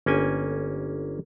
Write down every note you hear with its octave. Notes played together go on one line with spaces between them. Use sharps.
G1 A#3 C#4 G5 G#5